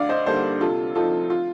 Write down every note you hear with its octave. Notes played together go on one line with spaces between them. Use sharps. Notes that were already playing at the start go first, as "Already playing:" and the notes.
Already playing: D2 D5 F5
C5 D#5
D3 G3 A#3 D#4 A4 C5
C3 F4 A4
F3 C4 D#4 F4 A4
F4